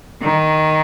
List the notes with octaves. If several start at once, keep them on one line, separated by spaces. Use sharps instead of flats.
D#3